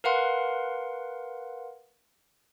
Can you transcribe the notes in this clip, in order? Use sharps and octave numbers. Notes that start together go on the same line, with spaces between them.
A#4 B4 F5 F#5 C6